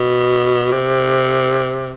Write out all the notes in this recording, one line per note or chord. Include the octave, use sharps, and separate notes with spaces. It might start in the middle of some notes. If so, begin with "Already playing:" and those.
Already playing: B2
C3